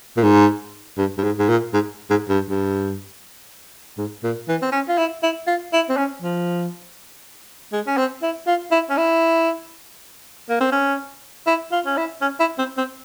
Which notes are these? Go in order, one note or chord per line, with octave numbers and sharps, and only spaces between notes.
A#2
G#2
G2
G2
G#2
G#2
A#2
G#2
G#2
G2
G2
G#2
A#2
E3
C4
C#4
F4
E4
E4
F4
E4
C4
C#4
F3
G#3
C#4
C4
E4
F4
E4
C#4
E4
A#3
C4
C#4
E4
F4
C#4
E4
C#4
E4
C4
C4